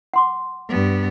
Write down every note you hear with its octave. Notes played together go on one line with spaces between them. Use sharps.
F#5 C6 D6
G2 B3